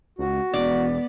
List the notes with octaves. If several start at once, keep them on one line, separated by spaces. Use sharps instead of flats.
C#2 F#4
E1 B3 D5